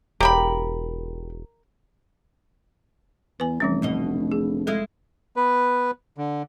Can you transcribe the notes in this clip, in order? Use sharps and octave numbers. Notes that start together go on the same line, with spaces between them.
E1 G4 A#4 G5 B5
E2 B4 G#5
F1 E3 G3 C#4
D2 B2 D#5
G#4
G#3 E4 A4 F5
B3 B4
D3